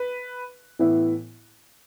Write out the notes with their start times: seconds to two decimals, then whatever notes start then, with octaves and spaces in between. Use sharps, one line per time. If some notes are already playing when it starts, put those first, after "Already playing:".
Already playing: B4
0.79 A2 E3 B3 E4